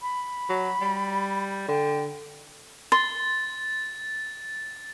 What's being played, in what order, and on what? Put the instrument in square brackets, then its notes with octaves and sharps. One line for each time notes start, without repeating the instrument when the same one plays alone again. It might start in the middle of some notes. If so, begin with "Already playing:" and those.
[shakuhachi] B5
[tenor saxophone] F#3
G3
[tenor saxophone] D3 [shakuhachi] G5
[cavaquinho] C6 [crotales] A6